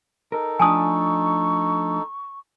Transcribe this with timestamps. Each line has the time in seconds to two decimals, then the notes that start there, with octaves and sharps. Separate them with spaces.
0.32 D#4 A4 A#4
0.59 F3 A3 D4 G#5 A5 C#6 D#6